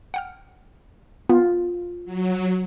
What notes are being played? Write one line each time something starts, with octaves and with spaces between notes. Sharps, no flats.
F#5 G5 F6
B3 F4
F#3